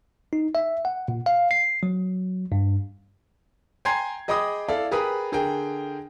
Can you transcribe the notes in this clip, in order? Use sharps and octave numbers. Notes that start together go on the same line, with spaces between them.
D#4
E5
F#5
A#2
F5
C7
F#3
G2
G5 G#5 A#5 C6 G#6 C7
G#4 D#5 G5 B5 D6 D#6
E4 A4 D5 F5
G4 G#4 A#4 B4 B5 D#6
D3 G#4 A#4 G5